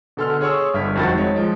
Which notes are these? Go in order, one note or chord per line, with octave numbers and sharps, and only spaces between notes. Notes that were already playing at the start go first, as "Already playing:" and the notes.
B2 D3 A4 G#5 C6 F6
G#4 C#5 C6 C#6 E6
G1 G2 E5 F6 G#6 B6
F2 D#3 F#4 C5 A6
G#3 C4 D#4 A#4 C#5
F3 G#3